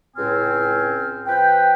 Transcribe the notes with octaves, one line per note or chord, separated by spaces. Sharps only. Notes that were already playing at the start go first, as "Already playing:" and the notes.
C#2 A2 C4 G#5 F6
F3 B4 G5